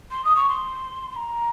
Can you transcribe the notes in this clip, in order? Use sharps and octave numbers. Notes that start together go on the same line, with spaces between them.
C6
D#6
C#6
C6
C6
A#5